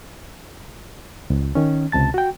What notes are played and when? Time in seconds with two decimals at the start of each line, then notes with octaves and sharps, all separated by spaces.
1.30 C#2
1.55 D#3 C#4
1.92 C#2 C3 A5 A6
2.14 F#4 G5